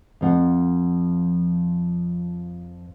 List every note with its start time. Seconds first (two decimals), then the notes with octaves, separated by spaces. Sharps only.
0.21 F2 F3 F#5